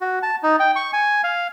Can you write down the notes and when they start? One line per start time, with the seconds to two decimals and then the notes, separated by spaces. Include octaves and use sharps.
0.01 F#4
0.23 A5
0.43 D#4
0.60 G5
0.76 C#6
0.93 G#5
1.24 F5